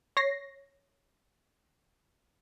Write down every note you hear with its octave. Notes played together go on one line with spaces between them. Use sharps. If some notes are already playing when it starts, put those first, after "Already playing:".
C#5 A#6 C7